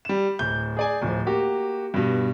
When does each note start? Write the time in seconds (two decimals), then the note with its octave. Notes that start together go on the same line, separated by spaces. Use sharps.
0.05 G3 E7
0.39 D1 G6
0.77 G#4 D5 G#5
1.02 D1 F3
1.26 A#3 F#4 G4
1.94 G2 B2